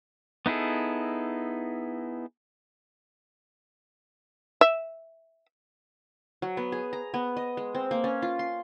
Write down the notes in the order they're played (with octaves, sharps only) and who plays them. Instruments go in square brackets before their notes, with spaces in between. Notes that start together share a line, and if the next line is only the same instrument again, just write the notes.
[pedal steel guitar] B3 D#4 E4 G#4 A4
[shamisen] E5
[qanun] F#3
B3
G#4
A#5
B3
D#5
G#3
C4
A#3
C#4
F4
C6